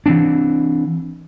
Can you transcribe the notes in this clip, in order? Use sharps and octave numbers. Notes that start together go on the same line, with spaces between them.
E3 C4 D4